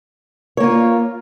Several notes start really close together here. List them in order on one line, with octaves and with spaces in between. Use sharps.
C#5 A#3 F4